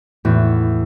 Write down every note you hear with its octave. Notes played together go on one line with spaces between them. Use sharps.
E2 A2 F#4